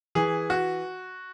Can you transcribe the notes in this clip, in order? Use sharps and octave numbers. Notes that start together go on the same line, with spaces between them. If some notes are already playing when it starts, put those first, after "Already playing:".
E3 G#4
F#4